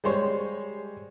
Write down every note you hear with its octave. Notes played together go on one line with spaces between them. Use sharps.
G3 G#3 C5 C#5